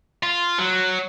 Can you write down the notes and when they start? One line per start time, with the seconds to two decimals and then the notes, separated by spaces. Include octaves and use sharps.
0.23 F4
0.59 F#3